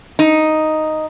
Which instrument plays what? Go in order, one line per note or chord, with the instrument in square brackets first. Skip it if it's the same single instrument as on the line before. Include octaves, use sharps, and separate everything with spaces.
[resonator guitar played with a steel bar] D#4